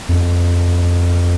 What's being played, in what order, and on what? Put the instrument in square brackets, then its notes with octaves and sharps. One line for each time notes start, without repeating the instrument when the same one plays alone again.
[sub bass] F2